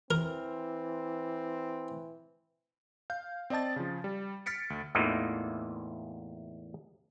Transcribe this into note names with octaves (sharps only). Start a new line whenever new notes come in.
E3 C4 A#4
F5 G6
C4 D5 D#5 A5 A6
C#3 F3
G3
F6 A6 B6 C#7 D7
D2
E2 A2 E3 A#3 D#4 F4